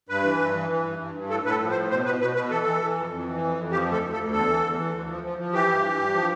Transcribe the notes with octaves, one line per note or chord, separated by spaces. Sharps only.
G2 B4
E3
G2
E3
E3
G2
G2
G2
A2 A4
A2 B4
A4
F3
C5
A2
B2 C5
B2 B4
B2 B4
B2 B4
E3 A4
E3
E3
F2
F2
E3
F2
F2
F3 G4
D2
A4
D2
A4
D2
E2 A4
E3
E2
E3
D2
F3
F3
F3
E3 G4
G2
E3
G2
F3